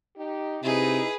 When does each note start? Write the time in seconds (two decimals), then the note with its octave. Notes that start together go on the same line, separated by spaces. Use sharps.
0.17 D#4 G4
0.63 C3 D#4 E4 G#4 B4